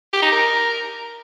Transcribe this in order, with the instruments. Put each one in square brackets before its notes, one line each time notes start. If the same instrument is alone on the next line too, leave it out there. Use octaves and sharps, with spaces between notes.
[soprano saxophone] G4
D#4
A#4